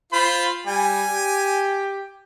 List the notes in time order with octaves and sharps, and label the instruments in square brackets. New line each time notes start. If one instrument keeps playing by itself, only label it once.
[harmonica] F4 C5 [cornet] B5
[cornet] G3 [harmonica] G#5
[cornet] G4